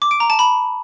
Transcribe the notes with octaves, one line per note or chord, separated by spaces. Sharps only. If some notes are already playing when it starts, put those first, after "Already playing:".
D6
D7
A#5
A5
B5